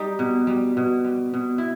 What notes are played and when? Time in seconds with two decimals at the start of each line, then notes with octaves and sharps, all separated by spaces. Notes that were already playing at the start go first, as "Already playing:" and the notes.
Already playing: G3 D#4 G4
0.19 B2
0.47 G3
0.77 B2
1.04 G3
1.34 B2
1.58 E4